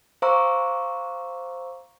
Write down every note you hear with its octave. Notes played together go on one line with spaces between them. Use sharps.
C5 F5 A#5 C#6 D6 E6